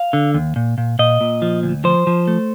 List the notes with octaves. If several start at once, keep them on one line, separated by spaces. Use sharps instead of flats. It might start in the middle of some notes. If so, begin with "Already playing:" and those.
Already playing: F5
D3
D#2
A#2
A#2
A#2 D#5
A#2
F3
D2
F3 C5
F3
A3